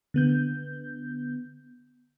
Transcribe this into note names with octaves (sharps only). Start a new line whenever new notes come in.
D3 B3 G6